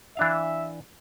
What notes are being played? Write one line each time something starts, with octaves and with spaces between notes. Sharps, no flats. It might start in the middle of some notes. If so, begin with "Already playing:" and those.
E3 D4 E5 F5